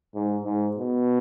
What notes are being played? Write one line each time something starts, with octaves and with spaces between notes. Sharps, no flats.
G#2
G#2
B2